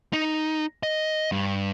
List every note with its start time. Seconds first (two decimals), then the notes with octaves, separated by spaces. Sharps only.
0.13 D#4
0.83 D#5
1.32 G2